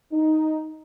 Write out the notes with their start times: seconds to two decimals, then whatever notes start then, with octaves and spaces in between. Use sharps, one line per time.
0.12 D#4